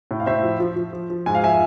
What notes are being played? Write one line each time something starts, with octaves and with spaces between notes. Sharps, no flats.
A2
F5
A2 C5 E5
F3
F3
F3
F3
F3
G#2 G#5
F5
F3 E5 G#5